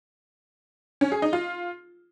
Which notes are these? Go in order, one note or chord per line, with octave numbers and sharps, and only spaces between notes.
C#4
G#4
D#4
F4